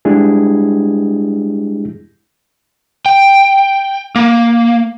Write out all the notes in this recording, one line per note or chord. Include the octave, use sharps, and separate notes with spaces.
G3 G#3 D4 E4 G4 G#4
G5
A#3